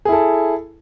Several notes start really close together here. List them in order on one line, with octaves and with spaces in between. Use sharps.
G#4 E4 A4